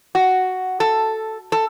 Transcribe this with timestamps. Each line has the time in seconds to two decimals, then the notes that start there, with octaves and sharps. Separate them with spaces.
0.15 F#4
0.80 A4
1.52 A4